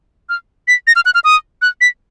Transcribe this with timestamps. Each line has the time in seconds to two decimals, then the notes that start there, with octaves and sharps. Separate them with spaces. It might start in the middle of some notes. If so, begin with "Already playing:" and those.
0.29 F6
0.68 B6
0.87 A#6
0.96 F6
1.06 F#6
1.14 F6
1.24 D#6
1.62 F#6
1.81 B6